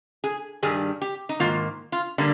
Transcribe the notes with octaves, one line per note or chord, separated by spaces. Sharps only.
G#4
G2 D#3 G3 G#4
G4
D#4
G#2 D#3 A#3 F4
F4
D3 G3 A#3 G4